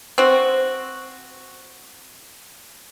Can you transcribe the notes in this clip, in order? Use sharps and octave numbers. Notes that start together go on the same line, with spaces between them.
C4 F#4